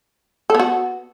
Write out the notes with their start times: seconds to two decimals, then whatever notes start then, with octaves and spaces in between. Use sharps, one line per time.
0.50 A4
0.55 B3
0.60 F#4